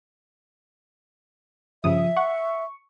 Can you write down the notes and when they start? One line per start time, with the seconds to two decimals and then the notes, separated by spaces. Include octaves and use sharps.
1.84 G2 C#3 F3 E5 D#6
2.17 F#5 C#6